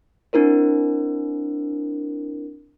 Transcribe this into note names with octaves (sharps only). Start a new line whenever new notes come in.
C4 D4 E4 A#4 C5